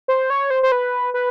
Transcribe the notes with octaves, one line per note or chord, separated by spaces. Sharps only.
C5
C#5
C5
C5
B4
B4